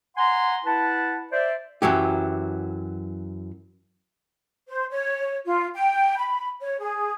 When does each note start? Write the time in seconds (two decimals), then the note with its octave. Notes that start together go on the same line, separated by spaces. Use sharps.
0.17 F#5 G#5 A#5 C6
0.65 E4 B4 F#5 A5
1.32 C5 D5 E5
1.82 F#2 E3 F#3 G4
4.68 C5
4.90 C#5
5.46 F4
5.75 G5
6.18 B5
6.61 C#5
6.80 G#4